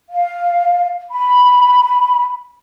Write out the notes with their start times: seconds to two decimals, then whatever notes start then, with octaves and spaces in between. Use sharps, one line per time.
0.09 F5
1.10 B5